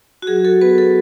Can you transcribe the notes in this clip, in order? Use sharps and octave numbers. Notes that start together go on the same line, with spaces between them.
F#4
F#3 G#4
A4
B3 F#4 B4
A4